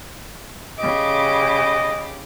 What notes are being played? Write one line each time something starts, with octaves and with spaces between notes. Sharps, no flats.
C#3 G4 D#5 D6